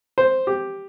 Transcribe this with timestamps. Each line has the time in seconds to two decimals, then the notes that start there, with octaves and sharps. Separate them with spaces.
0.18 C5
0.47 G4